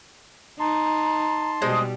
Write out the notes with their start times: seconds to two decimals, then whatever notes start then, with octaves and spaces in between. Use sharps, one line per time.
0.60 D#4 A5 A#5 C6
1.62 B2 G3 G#3 C4 D#5